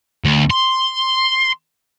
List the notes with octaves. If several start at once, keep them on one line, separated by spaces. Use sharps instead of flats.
D2
C6